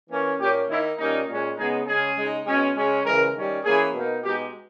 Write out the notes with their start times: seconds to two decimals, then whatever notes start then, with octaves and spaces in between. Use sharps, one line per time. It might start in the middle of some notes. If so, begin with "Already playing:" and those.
0.10 E3 A#3 C#4
0.39 A#2 A#3 C#4 G4
0.69 D#3 A#3 D#4 E4
0.98 A#2 G3 A#3 C#4 D#4
1.27 A#2 G#3 C#4
1.57 C#3 G#3 B3 D#4 G#4
1.87 C#3 G#3 C#4 G#4
2.17 C#3 G#3 D#4
2.46 B2 G#3 C#4
2.76 C#3 G#3 C#4
3.04 C#3 E3 G#3 A#4
3.34 D#3 G3 C#4
3.63 E3 A#3 C#4 G#4
3.93 B2 A#3 D#4
4.23 B2 G#3 D#4 G4